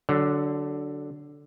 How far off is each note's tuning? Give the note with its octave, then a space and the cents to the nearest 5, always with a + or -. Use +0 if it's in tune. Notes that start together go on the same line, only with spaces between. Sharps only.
D3 +0 F#3 +20